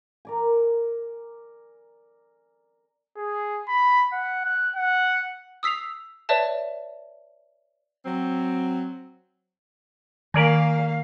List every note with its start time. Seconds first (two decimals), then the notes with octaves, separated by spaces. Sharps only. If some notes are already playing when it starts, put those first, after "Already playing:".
0.25 A#4 D5 G#5
3.17 G#4
3.68 B5
4.13 F#5
4.46 F#6
4.75 F#5
5.63 D#6 E6 B6 C7 F7
6.29 B4 C#5 D5 E5 A5
8.05 F#3 C4
10.34 D#3 A#3 A#4 D5 F5 G#5 B6